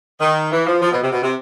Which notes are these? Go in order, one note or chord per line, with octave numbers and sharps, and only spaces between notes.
D#3
E3
F3
F3
B2
C3
B2
C3